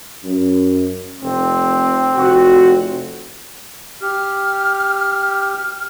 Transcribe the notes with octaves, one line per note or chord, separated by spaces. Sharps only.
F#2
F1 C4
F1 F#4
G4 F6